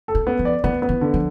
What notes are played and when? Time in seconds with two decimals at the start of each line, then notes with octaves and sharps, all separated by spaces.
0.08 A4
0.15 B3
0.27 B3
0.39 F3
0.45 D5
0.64 E3 B3
0.82 B3
0.89 E3
1.01 D3
1.14 F3